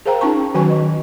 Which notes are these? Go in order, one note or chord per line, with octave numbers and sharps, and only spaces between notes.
G#4 A#4 C5 F5 G5 A#5
C#4 D#4 F4 G5 A5 C#6
D#3 F#3 F#4 B4 G#5 C#6
D#5